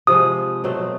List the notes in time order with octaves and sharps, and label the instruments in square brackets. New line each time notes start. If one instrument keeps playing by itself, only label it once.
[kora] C3 F3 G#3 [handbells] D#6
[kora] B2 F#3 A3 C4